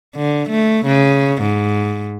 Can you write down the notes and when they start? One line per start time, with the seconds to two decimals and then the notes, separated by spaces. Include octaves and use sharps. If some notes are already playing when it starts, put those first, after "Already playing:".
0.15 D3
0.49 A3
0.86 C#3
1.42 G#2